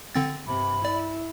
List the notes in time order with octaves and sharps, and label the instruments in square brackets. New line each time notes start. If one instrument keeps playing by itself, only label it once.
[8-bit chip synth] D3 C4 A6
[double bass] G2 C3 [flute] B5
[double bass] E4 [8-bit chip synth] D5